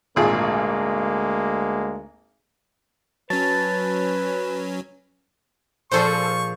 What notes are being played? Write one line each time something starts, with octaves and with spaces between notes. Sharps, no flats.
G#1 D2 A#2 G#3 A#3 G#4
F#3 C#4 B4 A5
A#2 F3 G#4 A4 C5 C#6